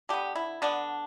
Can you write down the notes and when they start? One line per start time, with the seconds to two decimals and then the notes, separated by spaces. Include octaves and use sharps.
0.09 D3 B3 G4
0.35 E4
0.62 D3 B3 D4